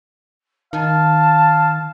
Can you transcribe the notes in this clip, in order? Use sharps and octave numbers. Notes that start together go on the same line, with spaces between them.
D#3 F5 A5